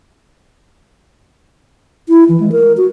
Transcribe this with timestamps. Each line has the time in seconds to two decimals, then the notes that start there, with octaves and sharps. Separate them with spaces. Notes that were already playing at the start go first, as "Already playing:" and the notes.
2.09 E4
2.29 E3
2.40 G#3
2.52 A#4
2.77 F#4